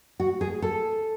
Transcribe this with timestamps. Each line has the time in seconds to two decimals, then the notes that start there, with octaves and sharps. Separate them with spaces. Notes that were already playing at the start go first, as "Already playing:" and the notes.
0.20 F#4
0.41 G#4
0.62 A4